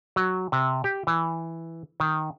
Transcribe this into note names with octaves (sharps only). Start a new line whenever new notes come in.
F#3
C3
G4
E3
D#3